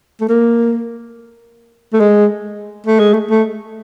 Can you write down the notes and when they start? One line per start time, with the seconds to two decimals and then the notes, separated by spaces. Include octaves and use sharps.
0.21 A3
0.29 A#3
1.93 A3
2.00 G#3
2.86 A3
2.99 G#3
3.14 A3
3.30 A3